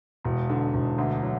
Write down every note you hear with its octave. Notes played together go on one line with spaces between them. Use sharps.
E1
D3
E1
D2
F#3